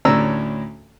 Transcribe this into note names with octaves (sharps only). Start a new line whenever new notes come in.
D2 A2 C#4 D4 A#5 E6